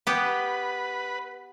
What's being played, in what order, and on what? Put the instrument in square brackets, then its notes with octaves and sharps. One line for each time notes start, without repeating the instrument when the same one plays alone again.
[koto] B3 G4 [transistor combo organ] B4